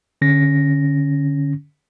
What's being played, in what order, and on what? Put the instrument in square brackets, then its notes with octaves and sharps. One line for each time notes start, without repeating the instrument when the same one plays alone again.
[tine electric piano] D3 C#4 A#6